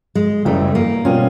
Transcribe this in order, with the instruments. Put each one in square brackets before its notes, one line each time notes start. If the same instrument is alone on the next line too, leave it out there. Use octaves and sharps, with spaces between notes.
[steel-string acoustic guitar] G#3
[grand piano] F#1 F#2 C#3 E3 G3 [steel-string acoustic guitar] A3
[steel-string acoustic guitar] A#3
[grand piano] B2 G3 C4 F4 [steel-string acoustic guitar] C#4